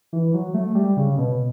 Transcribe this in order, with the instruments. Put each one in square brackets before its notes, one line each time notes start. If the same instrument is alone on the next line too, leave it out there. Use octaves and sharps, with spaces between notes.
[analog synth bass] E3
F#3
A3
G3
C#3
B2